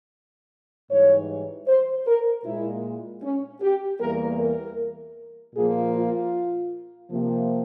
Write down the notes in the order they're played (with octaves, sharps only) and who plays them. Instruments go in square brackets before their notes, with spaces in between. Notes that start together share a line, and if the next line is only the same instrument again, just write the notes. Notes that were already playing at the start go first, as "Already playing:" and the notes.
[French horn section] G#2 E3 G3 C#5
C5
A#4
A#2 G#3 E4
C#4
G4
E2 E3 G3 A#3 A#4
A#4
A#2 F3 A#3 G#4
F4
C3 F3 A#3